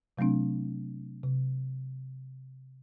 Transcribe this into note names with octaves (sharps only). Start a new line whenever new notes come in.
C3 F#3 A3 C4 D4
C3